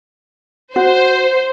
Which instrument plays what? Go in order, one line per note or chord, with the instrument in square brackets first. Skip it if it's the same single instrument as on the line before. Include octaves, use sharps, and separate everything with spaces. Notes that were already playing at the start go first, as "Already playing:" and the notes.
[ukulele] F#4 [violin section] C5